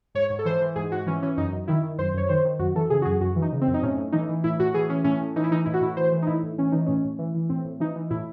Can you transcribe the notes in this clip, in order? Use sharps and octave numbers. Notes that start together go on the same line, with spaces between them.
G#2 C#5
G#2
A4
E3 C5
E3
G#2 G#4
G#2 F#4
E3 C#4
E3 C#4
F#2 D#4
F#2
D#3 E4
D#3
F#2 C5
F#2 C#5
D#3 C5
D#3
F#2 F#4
E3 A4
C#3 G#4
F#4
F#2 G#4
F#2 F#4
E3
D#4
C#3
C4
F#2
D#4
A2 C#4
A2
E3 D#4
E3
A2 E4
A2 F#4
E3 G#4
E3 C#4
A2 C#4
A2
E3 D#4
E4
E3 D#4
A2 E4
F#4
A2 E4
E3 C5
E3
D#4
A2 E4
A2
E3 C#4
E3 D#4
A2 C#4
A2
E3
E3
A2 C4
A2
E3 D#4
E3
A2 E4